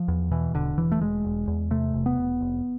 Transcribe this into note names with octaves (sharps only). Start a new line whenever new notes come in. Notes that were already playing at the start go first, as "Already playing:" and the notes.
Already playing: F3
E2
B2 E3
E1 D3
E1 E3
A3
E1 G#3
E1
E2
C3 A3
E1
B3
E1
F1